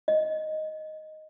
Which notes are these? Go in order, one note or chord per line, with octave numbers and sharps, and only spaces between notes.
D#5